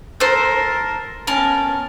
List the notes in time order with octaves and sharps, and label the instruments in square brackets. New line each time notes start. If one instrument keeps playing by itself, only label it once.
[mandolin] A4 C5 [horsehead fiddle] A#4
[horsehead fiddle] B3 C#4 [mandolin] A#4 A5